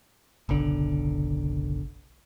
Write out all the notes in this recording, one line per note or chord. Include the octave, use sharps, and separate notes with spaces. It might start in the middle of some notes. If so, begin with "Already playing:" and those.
F#1 B1 D3